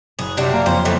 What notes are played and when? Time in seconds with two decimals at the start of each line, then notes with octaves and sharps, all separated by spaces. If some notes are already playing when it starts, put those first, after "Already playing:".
0.19 F#1 G#4 F#6
0.37 C3 G3 D4 F#4
0.53 A#3
0.66 F2 C#3 C4 C5
0.85 A2 E3 A3